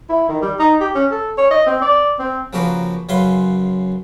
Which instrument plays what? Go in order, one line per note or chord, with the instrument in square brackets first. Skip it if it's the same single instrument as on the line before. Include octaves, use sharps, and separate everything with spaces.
[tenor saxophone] E4
D#3
G3
D#4
G4
C#4
A4
C#5
D#5
C4
D5
C4
[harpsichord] C#3 F3 A#3 F#4 A#4 B4
F#2 C#3 B4 F5 F#5 C6